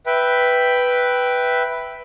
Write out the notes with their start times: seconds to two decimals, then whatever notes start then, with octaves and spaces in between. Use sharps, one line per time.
0.06 B4 E5 G5